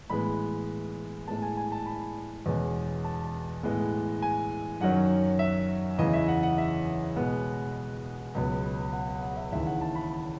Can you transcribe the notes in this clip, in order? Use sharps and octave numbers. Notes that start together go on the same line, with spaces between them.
A2 E3 G#3 B3 B5
A2 G#3 B3 A5
G#5
G#5
A5
B5
E2 B2 G#3 C#4
A5
A2 E3 G#3 B3
G#5
F#2 D#3 F#3 C#4 F#5
E5
E2 C#3 E3 D#5
E5
F#5
F#5
E5
B2 G#3 B3 F#5
C#2 B2 F#3 B3
F#5
F#5
F#5
E5
D#2 C#3 E3 E5
F#5
A5
B5